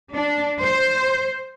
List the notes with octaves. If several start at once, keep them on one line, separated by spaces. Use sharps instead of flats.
D4
C5